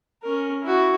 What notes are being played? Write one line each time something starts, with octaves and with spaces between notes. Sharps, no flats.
C#4 A#4
E4 F#4